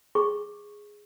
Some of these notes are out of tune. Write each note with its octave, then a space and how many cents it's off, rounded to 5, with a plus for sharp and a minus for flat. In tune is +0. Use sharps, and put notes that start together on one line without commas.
G#4 +0 C#6 -10